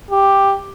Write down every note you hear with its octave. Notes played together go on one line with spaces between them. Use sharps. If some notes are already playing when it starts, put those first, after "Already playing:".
G4